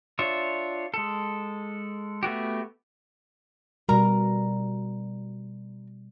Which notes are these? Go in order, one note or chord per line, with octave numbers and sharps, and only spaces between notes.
D4 F4 C#5 E5
G#3 A4
A3 B3 F#4 G4
B2 G3 A#4 A#5